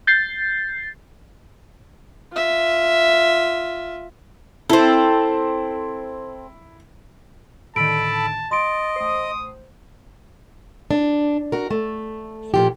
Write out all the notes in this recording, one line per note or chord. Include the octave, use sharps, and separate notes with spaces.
G6 A6 C7
F4 E5
C4 E4 A4
A2 D3 D#3 A4 A5 B5 D7
D#5 C6 A6 D7
A1 C5 D#6
D4
F#4 A#4
A3
A#2 F3 G4